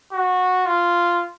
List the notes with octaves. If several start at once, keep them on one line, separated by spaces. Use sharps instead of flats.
F#4
F4